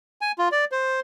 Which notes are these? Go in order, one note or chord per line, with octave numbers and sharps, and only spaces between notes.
G#5
F4
D5
C5